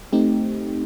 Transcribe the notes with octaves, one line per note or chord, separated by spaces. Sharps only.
A3 C4 D#4 G4